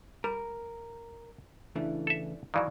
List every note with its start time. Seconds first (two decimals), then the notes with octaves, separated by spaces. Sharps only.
0.24 G3 A#4
1.76 C#3 E3 A3 D4 E4
2.07 A4 E5
2.54 D#3 E3 F#3 D5 F5